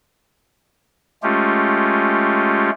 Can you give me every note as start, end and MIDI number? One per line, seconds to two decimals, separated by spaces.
1.23 2.70 56
1.23 2.70 57
1.23 2.70 61
1.23 2.70 65
1.23 2.70 67